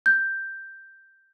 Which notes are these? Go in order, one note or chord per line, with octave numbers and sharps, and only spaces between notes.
G6